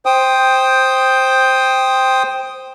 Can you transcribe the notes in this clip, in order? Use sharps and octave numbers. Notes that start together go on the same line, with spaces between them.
C5 G5 D#6